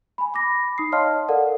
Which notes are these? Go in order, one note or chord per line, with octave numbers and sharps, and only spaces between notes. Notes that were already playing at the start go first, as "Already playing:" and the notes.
G#5 B5
B5 D6 A#6
D#4 D#6 C7
C#5 D#5 F5 A5 C6 F6
A4 A#4 D5 F5 F#5